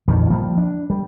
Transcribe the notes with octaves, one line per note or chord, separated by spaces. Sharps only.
A#1 F2 D#3
F3 G3 A#3
D4
G3